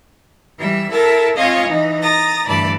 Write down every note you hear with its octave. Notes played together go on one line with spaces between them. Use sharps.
E3 G3 E5
E4 A4 A#4 E5 A5
C4 F4 C#5 D#5 F5 G#5
E3 D#4
A#5 D#6 A6 A#6
D2 G2 E3 D5 A5 B5